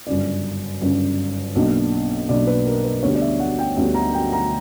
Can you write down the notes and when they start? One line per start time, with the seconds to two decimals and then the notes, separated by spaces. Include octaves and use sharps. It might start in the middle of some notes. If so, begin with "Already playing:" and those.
0.07 G1 F#2 C#3 D5
0.81 G1 F#2 C#3
1.55 B1 B2 A#3 D4
2.28 B1 B2 A#3 D4 D5
2.47 B4
2.66 A#4
2.84 B4
3.03 D2 D3 G3 B3 D4 C#5
3.15 D5
3.22 E5
3.40 F#5
3.59 G5
3.77 D2 D3 G3 B3 D4
3.94 A#5
4.13 G5
4.32 A#5